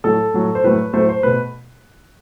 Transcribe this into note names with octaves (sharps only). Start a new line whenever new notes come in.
A2 F#3 A3 A4
A2 F#3 A3
C5
A2 F#3 A3 B4
A2 F#3 A3 C5
C5
B2 A3 B4